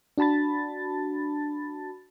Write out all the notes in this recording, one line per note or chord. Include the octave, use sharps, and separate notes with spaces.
D4 F#4 A5 B5 A6